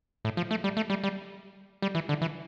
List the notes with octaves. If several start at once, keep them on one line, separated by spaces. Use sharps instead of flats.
A2
F3
A3
G3
A3
G3
G3
G3
E3
D3
E3